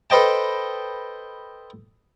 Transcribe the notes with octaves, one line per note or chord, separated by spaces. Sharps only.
A4 B4 C5 D#5 G5 A5